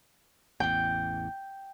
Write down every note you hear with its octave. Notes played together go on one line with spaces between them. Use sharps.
A1 E2 G5